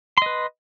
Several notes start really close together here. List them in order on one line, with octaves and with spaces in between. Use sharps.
C6 D#5 B4